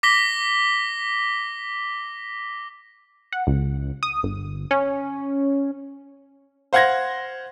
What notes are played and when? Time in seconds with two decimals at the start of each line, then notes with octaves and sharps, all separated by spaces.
0.03 D6 A#6 B6 G7
3.33 F#5
3.47 C#2
4.03 D#6
4.23 G1
4.71 C#4
6.73 C5 F5 F#5 C6 G#6 A#6